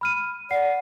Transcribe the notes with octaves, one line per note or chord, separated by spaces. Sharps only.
B5 F6 D#7
D5 F#5 C7